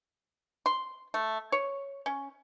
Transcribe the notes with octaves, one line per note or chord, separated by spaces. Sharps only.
C6
A3
C#5
C#4